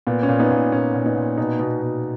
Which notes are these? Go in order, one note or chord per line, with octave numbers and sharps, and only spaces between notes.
A#2 B3
C#4
A#2
B3 D#4
A#2
A#2 C#4
A#2
B3 D#4
A#2
B2 B3 D#4
B2
B2